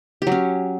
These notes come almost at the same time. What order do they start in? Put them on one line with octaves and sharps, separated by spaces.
G4 F#3 C#4